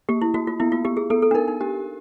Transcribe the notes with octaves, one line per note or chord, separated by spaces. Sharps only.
A#3 G4
E4
A#3 F#4
F4
B3 E4
F4
B3 G4
G#4
B3 A4
A4
D4
D#4 A#4
D#4
D4 G4